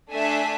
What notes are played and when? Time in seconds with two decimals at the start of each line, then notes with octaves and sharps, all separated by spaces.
0.10 A3 D4 A4 E5 G#5